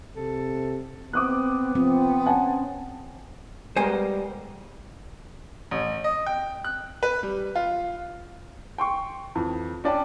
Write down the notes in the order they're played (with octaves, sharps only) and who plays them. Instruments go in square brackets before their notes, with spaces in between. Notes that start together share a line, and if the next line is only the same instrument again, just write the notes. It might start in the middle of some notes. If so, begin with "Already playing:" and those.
[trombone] C3 [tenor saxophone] A4
[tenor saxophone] B3 [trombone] C4 [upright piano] D6 D#6 F#6
[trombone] F3 [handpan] C4
[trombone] C#4 [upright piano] F#5 G#5 A5
[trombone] G3 [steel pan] G#3 B3 A#4 [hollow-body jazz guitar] C5 G#5
[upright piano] A1
D#5
G5
F#6
B4
G3
F4
G5 C6 C#6
F2 E3
C#4 D4 D5 G5 A5